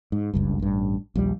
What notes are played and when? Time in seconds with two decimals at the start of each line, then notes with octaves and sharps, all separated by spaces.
0.12 G#2
0.34 F#1 C#2 G2
0.59 A1 G2
1.15 A#1 D#2 G3